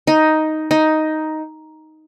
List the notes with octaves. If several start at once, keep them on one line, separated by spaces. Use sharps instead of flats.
D#4
D#4